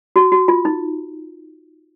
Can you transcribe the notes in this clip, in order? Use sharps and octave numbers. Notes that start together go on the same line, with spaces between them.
F#4
F#4
F4
D#4